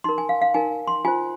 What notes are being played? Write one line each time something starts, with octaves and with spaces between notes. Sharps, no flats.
D#4 A#4 C6
G#5
F5
F5
D#4 A#4 G#5
C6
F4 C5 G#5